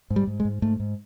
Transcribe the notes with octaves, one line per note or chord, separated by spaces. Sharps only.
G#2
G3
G#2
G#3
G#2
G#2 A3
G#2